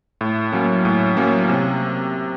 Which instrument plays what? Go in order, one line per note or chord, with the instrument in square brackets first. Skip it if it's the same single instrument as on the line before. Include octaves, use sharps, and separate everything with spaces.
[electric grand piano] A2
F#3 A#3 C#4
A2
F#3 A#3 C#4
C3